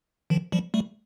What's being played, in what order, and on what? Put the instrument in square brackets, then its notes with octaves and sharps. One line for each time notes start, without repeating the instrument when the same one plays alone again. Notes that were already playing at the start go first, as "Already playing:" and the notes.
[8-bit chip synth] D#3 F3
F3 G3
G3 A3